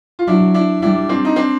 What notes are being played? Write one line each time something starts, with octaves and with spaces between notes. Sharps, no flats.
F4
F#3 D4 E4
D4 E4
G3 D4 E4
C4 D4
D#4
C4 D4